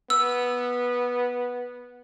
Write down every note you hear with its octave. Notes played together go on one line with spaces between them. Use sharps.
B3 E6